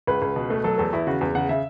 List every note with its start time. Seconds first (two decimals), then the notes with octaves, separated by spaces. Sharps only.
0.07 C#2 B4
0.22 C#2
0.36 B2
0.50 A3
0.64 F#3 A4
0.78 E2 A4
0.93 E2 E4
1.07 C#3 F#4
1.21 E2
1.35 C#3 F#5
1.49 C#3 E5